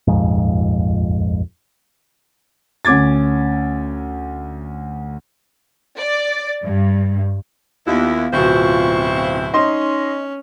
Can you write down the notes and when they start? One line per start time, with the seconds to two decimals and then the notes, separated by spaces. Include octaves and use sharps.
0.07 D#1 A#1 F2 G#2
2.85 D2 C#4 D6 G#6 A6
5.98 D5
6.64 G2
7.86 D#2 B3 E4 F4
8.33 D1 B2 C4 E4 C5 C#6
9.54 C#4 D#4 D#5 C6